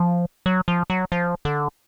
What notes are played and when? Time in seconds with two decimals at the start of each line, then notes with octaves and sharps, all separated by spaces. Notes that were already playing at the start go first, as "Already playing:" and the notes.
Already playing: F3
0.46 F#3
0.68 F3
0.90 F#3
1.12 F3
1.45 D3